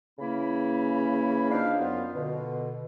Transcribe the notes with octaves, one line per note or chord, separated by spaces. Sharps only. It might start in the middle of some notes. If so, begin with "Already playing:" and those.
C#3 E3 A#3 C#4 E4 B5
D4 D#4 F4 C5 F5
F#2 B3 F4
B2 D3